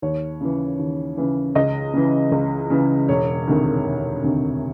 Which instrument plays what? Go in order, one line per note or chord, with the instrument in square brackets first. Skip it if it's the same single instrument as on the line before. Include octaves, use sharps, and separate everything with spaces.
[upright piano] D#2 C#5
C#3 E3
D#2
C#3 E3
C#2 D#5
C#3 E3
C#2
C#3 E3
E1 C#5
D2 C3 D#3
E1
D2 C3 D#3